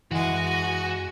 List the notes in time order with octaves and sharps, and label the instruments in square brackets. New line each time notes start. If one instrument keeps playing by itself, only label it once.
[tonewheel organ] F#2 [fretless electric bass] E3 [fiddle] G#3 G#5 [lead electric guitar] F#4